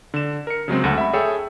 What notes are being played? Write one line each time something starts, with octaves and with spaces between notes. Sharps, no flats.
D3 E7
A#4 C#7
C#3 F#3 G#3 C4
D2 A4 F#5
E5 B5
G#4 A4 C#5 E5 G5